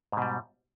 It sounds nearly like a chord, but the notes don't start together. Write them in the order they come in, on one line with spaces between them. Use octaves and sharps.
G#2 B2 G3